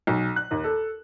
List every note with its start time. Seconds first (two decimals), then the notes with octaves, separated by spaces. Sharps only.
0.07 B1
0.36 F#6
0.51 D#2
0.64 A4